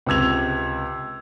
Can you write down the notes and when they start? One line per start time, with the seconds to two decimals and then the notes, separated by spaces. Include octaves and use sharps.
0.06 C#2 C3 E6 G#6 F7